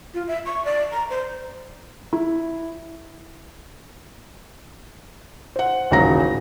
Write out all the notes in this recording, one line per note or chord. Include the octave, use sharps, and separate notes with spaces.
F4
E5
C#6
D5
A#5
C5
E4
C5 F#5
D#1 A1 C#3 F#4 A#5 A#6